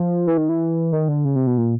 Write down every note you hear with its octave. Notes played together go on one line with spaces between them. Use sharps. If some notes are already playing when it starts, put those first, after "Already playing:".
Already playing: F3
E3
D#3
E3
D#3
D3
C#3
C3
B2
A#2